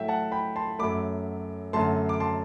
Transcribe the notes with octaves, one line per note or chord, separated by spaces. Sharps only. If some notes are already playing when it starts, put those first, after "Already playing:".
Already playing: A2 F#3 A3 E5 G5
F#5 A5
G5 B5
A5 C6
F#2 F#3 A3 B5 D6
F#2 D3 F#3 A3 A5 C6
D6
A5 C6